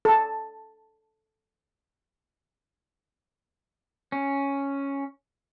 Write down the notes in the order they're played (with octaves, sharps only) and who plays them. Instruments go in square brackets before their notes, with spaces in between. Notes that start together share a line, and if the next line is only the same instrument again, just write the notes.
[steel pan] A4 A5
[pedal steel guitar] C#4